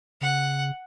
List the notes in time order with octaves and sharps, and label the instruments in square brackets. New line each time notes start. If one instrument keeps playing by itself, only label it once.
[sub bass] C#3 [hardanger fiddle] F#5